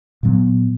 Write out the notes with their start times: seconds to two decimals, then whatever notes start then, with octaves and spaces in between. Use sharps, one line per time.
0.23 A#2 F#3 B3